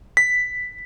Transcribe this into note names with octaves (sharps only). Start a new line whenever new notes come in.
B6